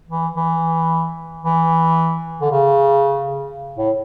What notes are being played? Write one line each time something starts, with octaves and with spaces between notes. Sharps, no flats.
E3
E3
E3
D3
C#3
A2